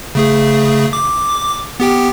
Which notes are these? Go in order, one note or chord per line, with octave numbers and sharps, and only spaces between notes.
C#3 A3 G#4
D6
B3 G4 G5